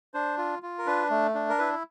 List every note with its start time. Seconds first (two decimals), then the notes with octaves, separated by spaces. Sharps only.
0.14 D4 C5
0.38 F4
0.62 F4
0.78 A#4
0.86 D4 B4
1.10 A3
1.34 D4
1.50 A#4
1.59 E4 B4